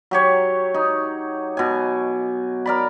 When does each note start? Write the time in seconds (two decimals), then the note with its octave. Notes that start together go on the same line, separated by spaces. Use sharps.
0.11 F#3 G4 C#5
0.74 D#4
1.57 B2 G#5
2.66 A#4 D5 B5